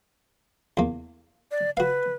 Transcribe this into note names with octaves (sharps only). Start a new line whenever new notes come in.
E2 A#3
D5
F#4 B4 F5